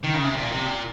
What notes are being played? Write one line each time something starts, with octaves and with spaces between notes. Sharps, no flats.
D#3
C#3
C3
A#2
C3
A#2